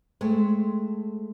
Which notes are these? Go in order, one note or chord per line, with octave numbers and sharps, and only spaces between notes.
G#3 A3 C4